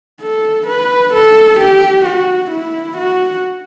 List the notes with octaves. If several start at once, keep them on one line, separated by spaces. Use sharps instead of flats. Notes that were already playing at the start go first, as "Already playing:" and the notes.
A4
B4
A4
G4
F#4
E4
F#4